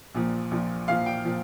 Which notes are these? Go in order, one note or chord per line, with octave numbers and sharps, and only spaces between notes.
A#1 A#2 F3
A#1 A#2 F3
A#1 A#2 F3 F5
G5
A#2 F3